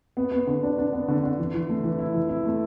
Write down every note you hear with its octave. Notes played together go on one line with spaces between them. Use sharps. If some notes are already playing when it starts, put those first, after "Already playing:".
B3
B3
D3
D4
D4
B3
D3
D3
E3
E3
A3
E3
E4
E3
E4
A3